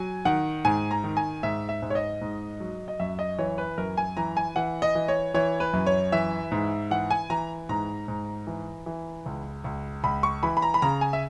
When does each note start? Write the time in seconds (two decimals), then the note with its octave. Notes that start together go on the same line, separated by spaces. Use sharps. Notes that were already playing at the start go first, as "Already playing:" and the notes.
Already playing: F#3 G#5
0.25 D#3 F#5
0.65 G#2 G#5
0.91 A#5
1.04 D#3
1.17 G#5
1.43 G#2 E5
1.69 E5
1.82 G#2
1.90 C#5
1.95 D#5
2.21 G#2
2.60 F#3
2.88 D#5
3.00 F#2 E5
3.19 D#5
3.38 E3 C#5
3.58 B4
3.78 F#2 A#4
3.97 G#5
4.17 E3 A#5
4.37 G#5
4.56 E3 F#5
4.82 D#5
4.95 E3
5.08 C#5
5.34 E3 C#5
5.60 B4
5.73 F#2
5.87 C#5
6.12 E3 E5
6.51 G#2
6.91 E3 F#5
7.11 G#5
7.30 E3 A#5
7.69 G#2 A#5
8.08 G#2
8.47 E3
8.86 E3
9.26 C#2
9.64 C#2
10.04 C#2 B5
10.23 C#6
10.43 E3 B5
10.57 B5
10.62 A#5
10.74 B5
10.82 C#3 A#5
11.01 G#5
11.13 E5